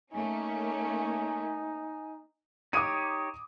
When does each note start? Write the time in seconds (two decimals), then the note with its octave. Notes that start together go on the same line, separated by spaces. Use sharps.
0.13 A3 A#3 C#4 D#4 G#5
2.73 D#4 G4 C#5 D6 D#6 D#7